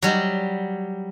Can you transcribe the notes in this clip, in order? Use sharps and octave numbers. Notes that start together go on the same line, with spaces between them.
F#3 G3